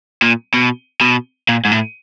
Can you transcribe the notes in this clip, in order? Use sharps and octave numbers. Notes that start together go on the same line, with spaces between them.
A#2
B2
B2
A#2
G#2
A2